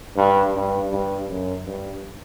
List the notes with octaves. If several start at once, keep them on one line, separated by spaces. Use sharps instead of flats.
G2
G2
G2
F#2
G2